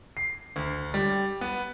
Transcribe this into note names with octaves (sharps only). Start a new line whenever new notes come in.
C7
D2
G3
B3